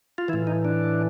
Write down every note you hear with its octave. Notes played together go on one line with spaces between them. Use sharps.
F4
A2 E3 E4
D#4
D4